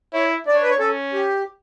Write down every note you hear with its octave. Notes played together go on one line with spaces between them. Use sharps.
E4 C#5
D4 D5
C#5
B4
C#5
C#4 A4
G4